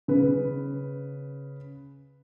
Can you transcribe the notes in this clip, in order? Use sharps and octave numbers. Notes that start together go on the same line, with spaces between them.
C#3 B4